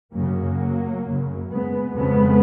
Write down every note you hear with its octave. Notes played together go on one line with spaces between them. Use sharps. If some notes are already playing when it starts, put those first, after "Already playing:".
F#2 C#3 F#3 A#3
F#2 C#3
G#3 B3
F2 C#3 G#3 B3